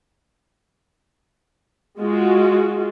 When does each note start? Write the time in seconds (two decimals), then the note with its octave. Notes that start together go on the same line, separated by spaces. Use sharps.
2.00 G#3 F4 F#4